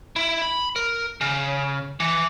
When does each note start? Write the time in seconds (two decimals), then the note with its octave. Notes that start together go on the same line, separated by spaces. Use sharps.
0.16 E4
0.42 B5
0.76 A#4
1.21 C#3
2.00 E3